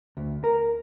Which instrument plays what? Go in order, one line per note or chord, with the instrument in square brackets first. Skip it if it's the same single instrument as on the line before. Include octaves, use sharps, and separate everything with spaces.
[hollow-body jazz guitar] D2
A#4